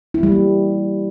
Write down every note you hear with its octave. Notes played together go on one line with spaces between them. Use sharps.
E4
G3
A#3